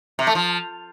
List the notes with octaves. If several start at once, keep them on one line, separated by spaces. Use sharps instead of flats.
C3
A3
F3